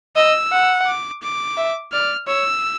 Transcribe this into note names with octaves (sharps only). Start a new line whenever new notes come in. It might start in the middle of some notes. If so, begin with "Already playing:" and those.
D#5 E6
F#5
D6
D6
E5
D5 F6
C#5 E6